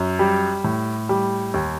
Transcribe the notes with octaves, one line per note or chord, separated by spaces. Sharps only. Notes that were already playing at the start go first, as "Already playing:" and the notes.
Already playing: F#2
G3
A2
G3
D#2